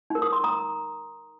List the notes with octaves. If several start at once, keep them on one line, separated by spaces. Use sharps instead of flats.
D#4 A#4
D#6
C6
A#5 D#6